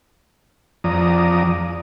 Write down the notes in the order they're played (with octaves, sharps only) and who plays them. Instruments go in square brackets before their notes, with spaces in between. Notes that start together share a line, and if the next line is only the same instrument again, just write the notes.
[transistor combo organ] F2 F3 D5 A#5 D#6